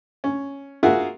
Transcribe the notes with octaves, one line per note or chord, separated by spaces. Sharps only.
C#4
F4 F#4 G#4 A#4 E5 F#5